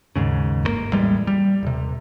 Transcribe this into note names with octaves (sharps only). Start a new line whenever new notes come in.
D#2 G#2 C#3
G1 C#3 A#3
A1 E2 G3 G#3
G3
D#1 C3